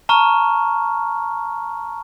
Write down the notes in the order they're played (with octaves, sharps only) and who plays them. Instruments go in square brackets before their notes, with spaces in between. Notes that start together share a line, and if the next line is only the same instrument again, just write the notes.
[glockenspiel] A5 A#5 C#6 F6